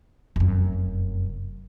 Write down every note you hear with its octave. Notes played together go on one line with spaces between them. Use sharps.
F1 F#2